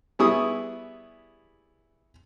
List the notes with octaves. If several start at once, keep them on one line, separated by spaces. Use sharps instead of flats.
G3 B3 E4 G#4 C#6 D#6